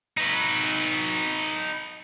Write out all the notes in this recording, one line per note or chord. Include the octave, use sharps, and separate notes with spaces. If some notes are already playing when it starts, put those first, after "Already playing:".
D#4 B4